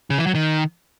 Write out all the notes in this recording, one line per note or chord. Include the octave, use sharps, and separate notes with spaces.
C#3
E3
F#3
D#3